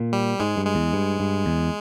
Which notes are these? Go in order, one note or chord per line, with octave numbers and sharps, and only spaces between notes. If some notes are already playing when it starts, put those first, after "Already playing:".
Already playing: A#2
G3
G#2 G#3
G2
G#3
E2
G2
G2
E2